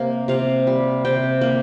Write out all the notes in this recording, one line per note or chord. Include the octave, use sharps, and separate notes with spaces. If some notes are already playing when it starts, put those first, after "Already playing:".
Already playing: C3 A#3
C3 F5
G3
C3 G5
A#3